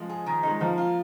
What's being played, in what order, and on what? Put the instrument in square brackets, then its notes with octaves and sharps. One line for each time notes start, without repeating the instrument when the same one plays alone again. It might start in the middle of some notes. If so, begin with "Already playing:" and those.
Already playing: [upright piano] F3 G#3
[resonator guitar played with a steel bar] G#4
D#3
[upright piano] G#3 [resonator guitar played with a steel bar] D#4
[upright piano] F3 [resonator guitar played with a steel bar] A#3
[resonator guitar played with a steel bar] F4